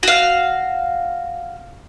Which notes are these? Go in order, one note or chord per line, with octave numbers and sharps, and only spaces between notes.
F#4 F5